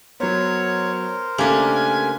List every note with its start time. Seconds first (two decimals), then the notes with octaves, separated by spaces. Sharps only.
0.20 F#3 B3 A#4 C5 C#5
1.38 C#3 A3 A#3 D4 G4 G#5